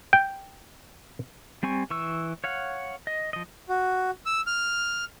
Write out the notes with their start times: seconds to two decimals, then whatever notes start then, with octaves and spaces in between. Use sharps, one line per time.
0.13 G5
1.63 G3 C4 G#5 C#6
1.91 E3 C#6 E6
2.44 C#5 F5 F#5
3.07 D#5
3.33 F3 D#5
3.69 F#4
4.26 E6
4.47 F6